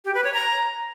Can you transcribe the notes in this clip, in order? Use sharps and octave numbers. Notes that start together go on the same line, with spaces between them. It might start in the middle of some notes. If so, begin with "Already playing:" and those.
G4
B4
C#5
A#5